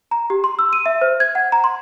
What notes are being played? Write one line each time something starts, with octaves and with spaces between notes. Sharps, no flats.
A#5
G4
C6
E6
D#7
E5
C5
G#6
F#5
A#5
C6